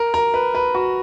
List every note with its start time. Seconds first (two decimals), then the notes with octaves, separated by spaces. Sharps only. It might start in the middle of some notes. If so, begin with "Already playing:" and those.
Already playing: A#4
0.14 A#4
0.34 B4
0.55 B4
0.75 F#4